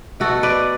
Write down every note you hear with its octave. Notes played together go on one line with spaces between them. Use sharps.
B2 A3 F#4 A4
B4 D5